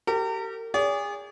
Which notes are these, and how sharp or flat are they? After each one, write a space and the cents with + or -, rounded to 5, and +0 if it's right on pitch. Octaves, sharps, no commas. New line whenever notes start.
G4 -25 A#4 -40
G#4 -30 D5 -45